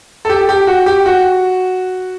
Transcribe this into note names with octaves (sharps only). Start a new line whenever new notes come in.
A4
G4
G4
F#4
G4
F#4